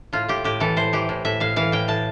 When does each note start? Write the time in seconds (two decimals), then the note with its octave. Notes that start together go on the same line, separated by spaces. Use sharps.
0.13 A2 F4
0.28 A2 G4
0.44 A2 G4
0.60 E3 A4
0.76 A2 C5
0.93 E3 G4
1.09 A2
1.25 A2 E5
1.40 A2 F5
1.56 E3 F5
1.72 A2 G5
1.88 A2 A5